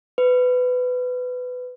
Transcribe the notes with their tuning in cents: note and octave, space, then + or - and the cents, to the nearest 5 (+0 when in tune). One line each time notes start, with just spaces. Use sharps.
B4 +20